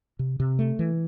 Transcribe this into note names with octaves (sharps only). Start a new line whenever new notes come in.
C3
C3
A3
E3